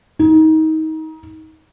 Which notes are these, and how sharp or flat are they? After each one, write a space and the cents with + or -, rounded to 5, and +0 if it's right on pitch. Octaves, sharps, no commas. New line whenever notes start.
D#4 +25